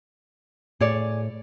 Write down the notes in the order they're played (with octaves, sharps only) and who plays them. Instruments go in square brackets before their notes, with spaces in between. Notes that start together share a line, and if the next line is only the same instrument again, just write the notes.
[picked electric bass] A2 [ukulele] G#4 C#5 D5